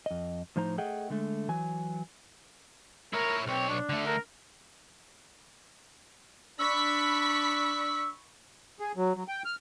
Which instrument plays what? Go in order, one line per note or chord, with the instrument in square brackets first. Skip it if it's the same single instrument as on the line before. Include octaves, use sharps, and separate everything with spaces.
[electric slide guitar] F2 D#5
A2 F3 D#4 C5 A#5
A3 G#4 D#5 F#5 G5
D3 G#3 A3
E3 F#3 G#5
[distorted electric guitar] E4 C#5 [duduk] A#4
[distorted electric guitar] B1 C#5 [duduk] C4
[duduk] D4
[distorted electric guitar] D3 A3
[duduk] A#4
[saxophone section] D4 [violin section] B5 C#6 B6 [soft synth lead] E6
[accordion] G#4
F#3
F#3
G5
F6